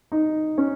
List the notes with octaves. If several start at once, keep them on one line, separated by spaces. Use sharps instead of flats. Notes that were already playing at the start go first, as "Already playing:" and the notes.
D#4
C#4